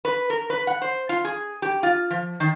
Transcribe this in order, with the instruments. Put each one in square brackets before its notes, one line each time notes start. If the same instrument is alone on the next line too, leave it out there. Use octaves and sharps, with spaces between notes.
[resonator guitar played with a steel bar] B4
A#4
B4
F#5
C5
F4
G#4
G4
F4
F3
D#3